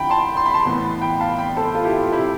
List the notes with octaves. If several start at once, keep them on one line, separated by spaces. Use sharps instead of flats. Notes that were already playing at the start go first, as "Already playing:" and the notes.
Already playing: D3 F3 G5 B5
A5 C6
C6
B5
A5 C6
A2 E3 B3
G5 B5
F5 A5
G5 B5
A4 C5
F4 A4
E4 G4
F4
C3 G3 C4 E4 G4